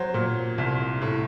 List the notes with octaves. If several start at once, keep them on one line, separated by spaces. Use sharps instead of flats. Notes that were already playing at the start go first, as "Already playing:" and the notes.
Already playing: F#3 C5
A#2
C2
A2